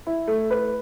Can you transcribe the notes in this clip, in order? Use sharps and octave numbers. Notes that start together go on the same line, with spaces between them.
E4
A3
B4